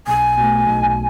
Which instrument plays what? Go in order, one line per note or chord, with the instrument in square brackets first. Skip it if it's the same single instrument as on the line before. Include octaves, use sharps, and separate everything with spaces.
[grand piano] B1 [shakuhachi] G#5
[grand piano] B2 A3
B1